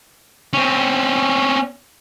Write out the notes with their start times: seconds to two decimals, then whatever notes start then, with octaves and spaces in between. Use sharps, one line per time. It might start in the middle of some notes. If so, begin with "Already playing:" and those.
0.53 C4 C#4